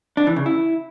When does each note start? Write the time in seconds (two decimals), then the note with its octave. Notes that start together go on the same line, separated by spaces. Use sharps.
0.17 D4
0.27 E3
0.36 C#3
0.46 E4